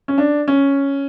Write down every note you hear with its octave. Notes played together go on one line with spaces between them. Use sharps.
C#4
D4
C#4